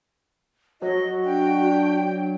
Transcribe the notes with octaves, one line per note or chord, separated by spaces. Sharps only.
F#3 F#4 D#5
D4 G5